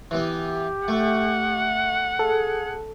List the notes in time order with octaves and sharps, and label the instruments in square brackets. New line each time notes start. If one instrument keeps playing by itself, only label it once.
[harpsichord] E3 B3 [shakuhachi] G4
[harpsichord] A3 [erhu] F#5
[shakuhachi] G#4 [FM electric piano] A4